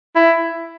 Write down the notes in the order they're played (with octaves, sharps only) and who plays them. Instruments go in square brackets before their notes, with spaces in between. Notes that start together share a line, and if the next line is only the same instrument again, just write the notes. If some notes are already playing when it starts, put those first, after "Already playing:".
[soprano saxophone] E4